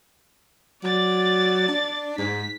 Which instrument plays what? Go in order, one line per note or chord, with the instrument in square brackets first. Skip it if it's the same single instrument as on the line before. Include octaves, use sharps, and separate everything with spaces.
[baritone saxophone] F#3 [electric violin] D5 A6
[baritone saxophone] D4
[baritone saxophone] G#2 [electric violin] B6